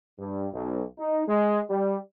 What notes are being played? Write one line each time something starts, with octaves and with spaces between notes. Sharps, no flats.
G2
B1
D#4
G#3
G3